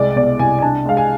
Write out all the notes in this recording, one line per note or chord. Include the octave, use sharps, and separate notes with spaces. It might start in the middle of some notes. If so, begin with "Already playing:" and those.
Already playing: C2 G#3 D5
B2 D5
C2 G#5
G#5
D4 A5
G#3 F5
G#5